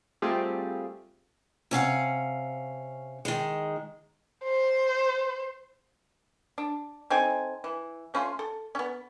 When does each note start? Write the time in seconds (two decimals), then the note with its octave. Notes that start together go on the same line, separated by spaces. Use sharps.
0.22 G3 A3 C4 F4 G4 G#4
1.71 C3 C#4 F5 F#5
3.25 D#3 G#3
4.43 C5
6.58 D4
7.10 C4 D#4 A4 G#5
7.64 E3
8.14 A3 C#4 F4 C6
8.39 A4
8.75 B3 C#4